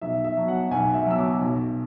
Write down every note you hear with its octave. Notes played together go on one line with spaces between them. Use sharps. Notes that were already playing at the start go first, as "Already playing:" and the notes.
B1 E5
E5
B2 F#3
F#5
B1 G#5
E5
B2 F#3 E6
D6
B1